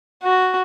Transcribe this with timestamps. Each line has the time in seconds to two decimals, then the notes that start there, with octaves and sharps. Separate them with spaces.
0.23 F#4